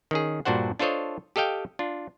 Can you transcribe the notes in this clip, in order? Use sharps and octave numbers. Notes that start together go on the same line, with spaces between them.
D#3 C#4 G#4
G2 A#2 D4 F#4 C5 F#5
D4 F4 A4 C5 C#5 D#5
G4 A4 D#5 F5 G5
D4 F4